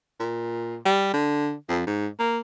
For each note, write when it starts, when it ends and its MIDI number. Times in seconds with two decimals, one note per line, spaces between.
0.20 0.77 46
0.85 1.09 55
1.14 1.54 50
1.69 1.83 41
1.86 2.07 44
2.19 2.39 58